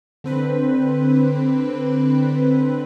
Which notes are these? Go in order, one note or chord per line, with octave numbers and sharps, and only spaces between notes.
D3 C4 B4